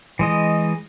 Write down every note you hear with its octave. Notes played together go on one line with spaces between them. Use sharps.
E3 G#3 D#5